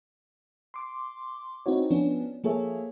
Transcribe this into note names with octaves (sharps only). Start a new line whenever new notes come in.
C6 D6
C4 D#4 E4 F#4 C#5
F3 B3 C#4 D4
F3 A#3 G#4 A4 C#5 E5